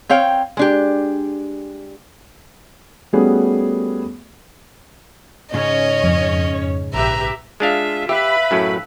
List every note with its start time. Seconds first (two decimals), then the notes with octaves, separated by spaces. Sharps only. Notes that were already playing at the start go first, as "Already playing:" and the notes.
0.09 C4 C#5 F5 G5
0.57 G#3 D4 G4
3.13 G3 A3 B3 C#4 F#4 G#4
5.54 G#2 C#3 C#4 C#5 D#5
6.04 F2
6.94 A#1 G4 B4 E5 A#5
7.60 G#3 D4 F4 E5 F5
8.09 G4 B4 E5 F5 B5
8.51 F#2 A2 F#3